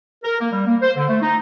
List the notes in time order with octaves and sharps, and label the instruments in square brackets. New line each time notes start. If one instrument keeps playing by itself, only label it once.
[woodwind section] A#4
A#3
G3
A#3
C5
D3
A3
D#4